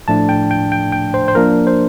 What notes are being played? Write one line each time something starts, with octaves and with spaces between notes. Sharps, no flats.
A2 F3 A3 D4 A5
G5
G5
G5
G5
C5
C5
F3 A#3 D4 A#4
C5